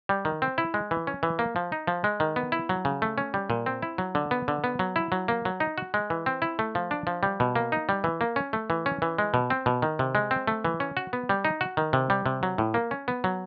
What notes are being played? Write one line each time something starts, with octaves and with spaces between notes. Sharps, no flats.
G3
D#3
C4
E4
G#3
E3
C#4
E3
A#3
F3
D#4
F3
G#3
D#3
B3
E4
F#3
C#3
A3
C#4
G3
A#2
C4
E4
F#3
D3
B3
D3
B3
F#3
E4
F#3
A#3
F#3
D#4
F#4
G#3
E3
C4
E4
A3
F3
D4
F3
G3
B2
A#3
D#4
G3
E3
A#3
C#4
A3
E3
C#4
E3
G#3
B2
C4
B2
D#3
C3
G#3
C4
A3
E3
C#4
F#4
B3
G3
D#4
F#4
D#3
C3
G3
C3
F#3
A2
A#3
C#4
B3
F#3